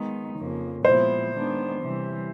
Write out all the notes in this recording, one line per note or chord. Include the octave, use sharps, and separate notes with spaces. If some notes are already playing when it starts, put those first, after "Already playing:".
Already playing: D#3 G#3 B3 D#4
F2 C#3 F3 A#3
A#2 F3 G#3 B3 E4 C5
D#3 G#3 B3 D4
C3 E3 G3